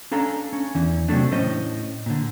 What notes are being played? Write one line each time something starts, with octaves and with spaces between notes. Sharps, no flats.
C#4 D4 A4 F5 A#5
C#4
E2 E3
C3 F#3 G#3 A3 D4
A2 C#4 C5 D#5
A#2 D3